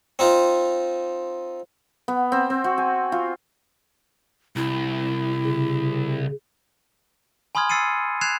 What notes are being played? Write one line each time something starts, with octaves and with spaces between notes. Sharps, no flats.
C4 D#4 F4
B3
C4
C4
F#4
G#5
F4
C2 E4
C#3
G#5 B5 C6 D#6 F6 G#6
E6 A6 C7 C#7 D#7
F#6 G#6 C7 E7 F7